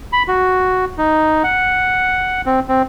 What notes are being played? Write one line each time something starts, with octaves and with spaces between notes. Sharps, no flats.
B5
F#4
D#4
F#5
C4
C4